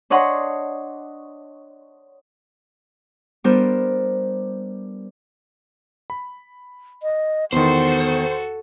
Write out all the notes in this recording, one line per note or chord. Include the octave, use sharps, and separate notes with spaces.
D4 C#5 D#5 F#5 C6
G3 B3 D4 A#4 C5
B5
D#5
E2 D#3 B3 F#4 A4 C5